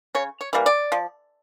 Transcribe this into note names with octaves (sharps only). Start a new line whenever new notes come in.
C#3 C#5
C#5
E3 G3 A#3
D5
F3